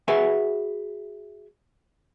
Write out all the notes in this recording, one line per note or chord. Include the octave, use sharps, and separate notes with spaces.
F#4 G#4 B4 E5 F#5 G#5